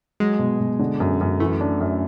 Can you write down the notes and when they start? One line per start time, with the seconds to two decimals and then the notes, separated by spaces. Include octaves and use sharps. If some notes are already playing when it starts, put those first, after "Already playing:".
0.20 F#3 G#3
0.39 B2
0.60 B2
0.79 D3
1.00 F#2
1.21 F#2
1.40 E3 A3
1.61 D4
1.80 F#2